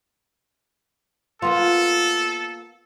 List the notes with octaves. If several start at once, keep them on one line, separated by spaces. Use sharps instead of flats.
A#3 B3 F4 A4